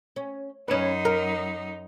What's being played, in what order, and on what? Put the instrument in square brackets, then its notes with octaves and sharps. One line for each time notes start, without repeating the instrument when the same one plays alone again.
[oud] C#4
[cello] F#2 D#4 [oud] C#4 B4
[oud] A#4